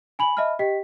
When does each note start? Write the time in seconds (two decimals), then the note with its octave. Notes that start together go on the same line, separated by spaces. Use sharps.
0.19 G#5 B5 F#7
0.37 D#5 E5 A5 B5 F6
0.59 G4 D#5 G5 B6